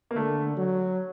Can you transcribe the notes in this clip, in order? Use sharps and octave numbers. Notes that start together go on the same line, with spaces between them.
A#3
D3 A3
F#3